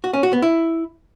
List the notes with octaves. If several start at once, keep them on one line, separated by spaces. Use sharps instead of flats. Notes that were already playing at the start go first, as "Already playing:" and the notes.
F#4
C#4
F#4
B3
E4